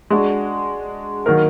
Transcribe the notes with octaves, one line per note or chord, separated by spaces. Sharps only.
G#3 D4 F#4
D#3 F#3 A#3 D#4 A#4